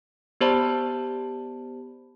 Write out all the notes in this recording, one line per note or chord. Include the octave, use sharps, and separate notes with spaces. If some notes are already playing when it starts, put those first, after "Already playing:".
B3 G4 C5 D5 A5 B5